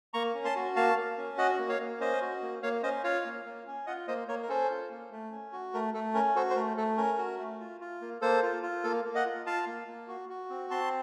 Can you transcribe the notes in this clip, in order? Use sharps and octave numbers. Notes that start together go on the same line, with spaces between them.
A#3 A#5 C#6
C#4
A5 C6
F#4
A#3 F5 A5
A#3
C#4
F#4 D#5 F#5
A#3
C#5 F5
A#3
C#4 C5 D#5
F#4
A#3
A#3 C#5 F5
C#4 C5 D#5
F4 C#5 F5
A#3
A#3
C#4
F4 D#5 F#5
A#3 C5 D#5
A#3 A#4 C#5
A#4
C#4 A4 C5
F4
A#3
A3
C#4
F#4
A3 A#4
A3 A4
C#4 A#4
F#4 A4 C5
C5
A3 A#4
A3 A4
C#4 A#4
F#4
A3
F4
F4
A#3
A#3 A4 C5
F4
F4
A#3 A4
A#3
D#5 F#5
F4
F4 F5 A5
A#3
A#3
F#4
F#4
C4
C4 A5 C6